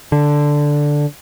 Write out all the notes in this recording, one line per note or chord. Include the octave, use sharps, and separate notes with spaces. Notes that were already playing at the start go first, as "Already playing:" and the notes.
D3